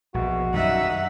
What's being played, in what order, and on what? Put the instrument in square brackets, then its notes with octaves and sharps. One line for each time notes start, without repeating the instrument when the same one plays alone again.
[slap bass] A#1 [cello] B2 [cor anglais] F#4
[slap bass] F#2 D#3 G3 [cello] D#4 E5 [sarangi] F#5